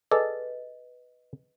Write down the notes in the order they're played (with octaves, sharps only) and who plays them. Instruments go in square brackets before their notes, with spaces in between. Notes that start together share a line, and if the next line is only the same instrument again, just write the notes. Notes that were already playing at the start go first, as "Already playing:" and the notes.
[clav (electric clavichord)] G#4 A4 D5 [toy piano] B4 D#5